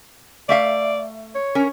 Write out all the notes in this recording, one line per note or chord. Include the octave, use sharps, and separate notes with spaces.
A3 D5 E5 F5
C#5
C#4 A#4